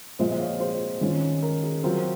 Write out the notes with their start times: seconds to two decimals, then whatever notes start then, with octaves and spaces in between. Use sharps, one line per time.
0.19 A#2 F3 G#3 C4 F4 C5 D#5
0.31 D#5
0.40 C#5 F5
0.60 G#4 C5
1.01 D#3 G#3 C#4 F4
1.42 A#4
1.63 G#4
1.83 F#3 C4 F4 A#4